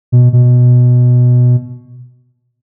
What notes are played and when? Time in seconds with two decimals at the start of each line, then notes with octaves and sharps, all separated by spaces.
0.12 B2
0.33 B2